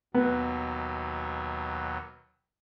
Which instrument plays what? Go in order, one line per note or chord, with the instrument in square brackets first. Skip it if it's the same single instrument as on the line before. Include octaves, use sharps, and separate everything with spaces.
[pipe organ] D#2 B2 F#3 [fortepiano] B3